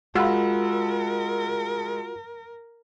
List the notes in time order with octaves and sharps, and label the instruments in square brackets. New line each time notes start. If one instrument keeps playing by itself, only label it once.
[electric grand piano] G#3 E6 [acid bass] F4 [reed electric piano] F#4 F#5 B5 [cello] A#4